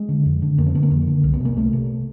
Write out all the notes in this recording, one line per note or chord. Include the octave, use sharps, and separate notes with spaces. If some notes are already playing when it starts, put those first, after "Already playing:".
Already playing: G#3
D3
F2
D3
F2 A#3
C4
D3 B3
A#3
F2
D3
C2
B3
C3 A#3
C2 A3
C3